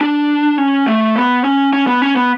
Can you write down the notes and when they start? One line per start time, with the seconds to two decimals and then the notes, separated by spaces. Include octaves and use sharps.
0.01 D4
0.58 C#4
0.87 A3
1.16 B3
1.45 C#4
1.73 C#4
1.87 B3
2.02 C#4
2.16 B3